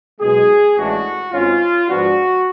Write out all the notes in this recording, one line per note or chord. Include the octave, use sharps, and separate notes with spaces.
B1 B2 G#3 G#4
A1 A2 G#3 D4 F#4
G#1 G#2 G#3 C#4 F4
G#2 F3 B3 D4 F#4